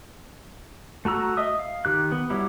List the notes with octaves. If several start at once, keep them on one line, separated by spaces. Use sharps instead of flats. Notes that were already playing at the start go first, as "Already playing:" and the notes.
A3 F#4 A#5 E6
D#5 E5 D#6
F5
D#3 G4 F#6
B3
F#3 G3 E4